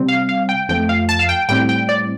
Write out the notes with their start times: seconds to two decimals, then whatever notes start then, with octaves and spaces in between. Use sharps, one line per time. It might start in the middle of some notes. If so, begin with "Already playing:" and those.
Already playing: C3 G3 C4
0.08 F5
0.29 F5
0.49 G5
0.69 F2 F3 A3 G5
0.89 F5
1.09 A5
1.19 F5
1.29 G5
1.49 A2 G3 C4 G5
1.69 G5
1.89 D5